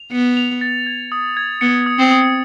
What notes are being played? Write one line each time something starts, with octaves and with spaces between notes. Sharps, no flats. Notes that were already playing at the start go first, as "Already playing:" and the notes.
Already playing: F7
B3 C#7
F7
A6
G#6
D#6
G#6
B3 C#7
D#6
C4
D#6